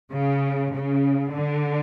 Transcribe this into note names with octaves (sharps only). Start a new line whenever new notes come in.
C#3
C#3
D3